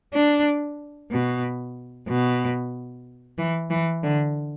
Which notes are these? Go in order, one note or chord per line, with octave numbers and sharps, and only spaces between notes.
D4
B2
B2
E3
E3
D3